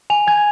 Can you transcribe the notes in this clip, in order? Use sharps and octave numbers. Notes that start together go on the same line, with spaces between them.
G#5 F7
G#5 G#6